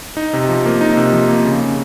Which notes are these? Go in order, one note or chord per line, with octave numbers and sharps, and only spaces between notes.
D#4
C3
F3
A#3
D#4
C3
F3
A#3
C#3
C#3